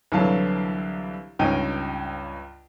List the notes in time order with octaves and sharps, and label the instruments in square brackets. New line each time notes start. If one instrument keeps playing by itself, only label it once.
[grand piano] C2 D3 E3 F#3 F5 A5
C#2 G2 C#4 D#4 G5 D#7